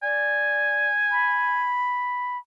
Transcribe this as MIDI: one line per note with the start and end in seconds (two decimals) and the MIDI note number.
0.03 0.89 74
0.03 1.69 80
1.12 2.38 83